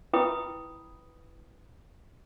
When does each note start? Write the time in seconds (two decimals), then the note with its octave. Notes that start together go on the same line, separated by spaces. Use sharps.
0.13 E4 B4 G5 B5 D#6